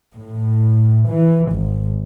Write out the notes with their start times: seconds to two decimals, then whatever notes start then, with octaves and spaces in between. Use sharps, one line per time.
0.15 A2
1.10 E3
1.52 G#1